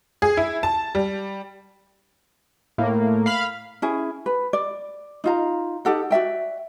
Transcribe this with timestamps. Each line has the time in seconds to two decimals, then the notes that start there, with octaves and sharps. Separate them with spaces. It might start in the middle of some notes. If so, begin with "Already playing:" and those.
0.22 G#4
0.37 E4
0.63 A5
0.95 G3
2.78 A2 A#3
3.26 F5 B5 F6
3.82 C#4 E4 G#4
4.26 B4
4.53 D5
5.24 D#4 F4 A#5
5.85 D#4 G4 A4 F#5
6.11 F#4 D5 E5 G5